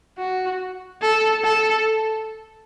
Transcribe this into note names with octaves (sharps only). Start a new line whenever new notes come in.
F#4
A4
A4